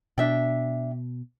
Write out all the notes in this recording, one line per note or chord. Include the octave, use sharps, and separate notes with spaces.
B2 D4 E5 G5